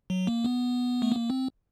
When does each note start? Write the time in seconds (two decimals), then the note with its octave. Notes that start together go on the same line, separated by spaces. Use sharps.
0.10 F#3
0.27 A#3
0.44 B3
1.02 A3
1.12 A#3
1.30 C4